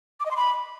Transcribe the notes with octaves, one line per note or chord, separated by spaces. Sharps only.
D6
D#5
C6
B5